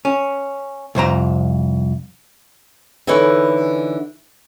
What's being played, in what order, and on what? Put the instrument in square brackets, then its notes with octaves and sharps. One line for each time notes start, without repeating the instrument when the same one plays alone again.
[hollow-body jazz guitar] C#4
C2 F2 C5 A#5
[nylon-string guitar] D3 E3 D#4 G#4 B4 C#5